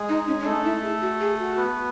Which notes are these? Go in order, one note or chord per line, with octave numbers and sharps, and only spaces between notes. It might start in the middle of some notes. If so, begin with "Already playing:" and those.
Already playing: G#3 G#4
D#4
C#4
C#4
A3 D#4 A4
E4
G#4
F#4
G#4
F#4
B3 B4